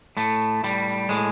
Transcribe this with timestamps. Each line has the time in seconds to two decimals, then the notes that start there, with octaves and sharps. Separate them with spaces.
0.17 A2 A3
0.64 A2 G3
1.09 A2 G#3